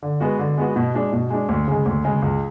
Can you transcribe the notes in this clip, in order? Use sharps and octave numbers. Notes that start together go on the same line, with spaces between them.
D3
G#3 B3 F#4
D3
G#3 B3 F#4
B2
G#3 D4
B2
G#3 D4
D2
C#3 G#3
D2
C#3 G#3
C#2